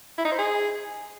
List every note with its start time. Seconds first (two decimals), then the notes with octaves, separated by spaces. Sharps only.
0.18 E4
0.25 D#4
0.32 C5
0.39 G#4